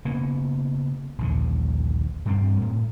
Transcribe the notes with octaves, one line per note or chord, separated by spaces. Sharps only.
C#3 A#3 B3 C#4
A#1 D#2 D3
G2 G3 C4
A2